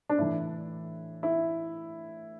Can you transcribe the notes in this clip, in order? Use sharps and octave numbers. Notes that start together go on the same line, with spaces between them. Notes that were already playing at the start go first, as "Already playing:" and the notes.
D4
A2 E3 E4
E4